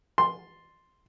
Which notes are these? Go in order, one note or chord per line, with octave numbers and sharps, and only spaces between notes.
C6